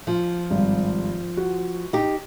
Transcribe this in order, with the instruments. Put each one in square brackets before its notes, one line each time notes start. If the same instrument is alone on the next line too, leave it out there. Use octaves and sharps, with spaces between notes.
[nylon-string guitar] F3 [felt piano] F4
[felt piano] G#1 G2
F#4
[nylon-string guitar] D#4 G4